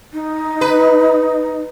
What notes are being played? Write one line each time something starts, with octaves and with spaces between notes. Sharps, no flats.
D#4
B4